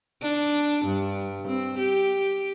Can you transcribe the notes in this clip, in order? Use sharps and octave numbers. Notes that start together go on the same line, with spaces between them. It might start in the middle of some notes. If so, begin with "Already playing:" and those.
D4
G2
C4
G4